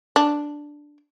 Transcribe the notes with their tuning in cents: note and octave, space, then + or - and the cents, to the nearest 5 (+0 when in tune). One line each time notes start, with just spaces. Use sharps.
D4 +0